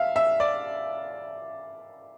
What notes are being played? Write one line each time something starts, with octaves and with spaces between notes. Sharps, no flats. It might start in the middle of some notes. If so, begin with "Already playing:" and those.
Already playing: E5 F5
E5
D5